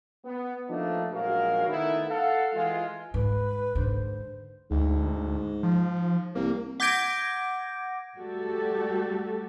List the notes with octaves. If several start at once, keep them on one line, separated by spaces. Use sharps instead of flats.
B3
F3 A3 A#3 D4 D#4
A#1 F#2 G#3 F#4 A#4 F5
D#3 A3 B3 D#4 E4
A4 F5 F#5
E3 G#3 F4
G#2 B4
G#2 D3 C5
D2 G#2
F3
C2 A#3
F#5 D6 G6 G#6 A#6 D7
G3 A3 F#4 G4 A4